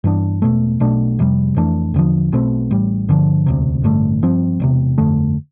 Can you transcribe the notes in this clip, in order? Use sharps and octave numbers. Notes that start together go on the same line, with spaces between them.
G2 E3 B3 D4
E1 E2 B2 A3
B1 B2 A3 D4
F1 F2 C3 G3
F2 E3 A3 D4
E2 D3 F3
B1 B2 A3 C4
A1 A2 G3
G1 G2 D3 F3
E1 D2 C3
A1 G2 D3 A3
G2 F3 C4
E1 E2 C3
G1 F2 D3 A3